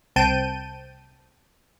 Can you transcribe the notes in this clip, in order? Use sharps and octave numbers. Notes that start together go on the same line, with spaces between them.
C2 C4 G5 A5 G6 D#7